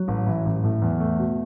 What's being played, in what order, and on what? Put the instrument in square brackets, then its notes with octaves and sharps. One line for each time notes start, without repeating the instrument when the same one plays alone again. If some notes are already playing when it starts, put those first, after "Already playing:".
Already playing: [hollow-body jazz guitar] F#3
[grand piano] A1
E3
A1
A2
E2
A3
B2